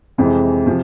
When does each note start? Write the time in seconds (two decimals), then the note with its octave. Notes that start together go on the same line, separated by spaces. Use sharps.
0.18 F2 C3 E3 G#3 C4
0.66 C3 F3